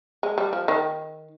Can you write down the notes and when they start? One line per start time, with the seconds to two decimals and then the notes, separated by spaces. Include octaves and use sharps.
0.23 G#3
0.38 G3
0.53 F3
0.68 D#3